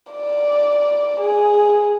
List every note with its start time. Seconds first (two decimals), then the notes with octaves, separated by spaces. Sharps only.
0.12 D5
1.20 G#4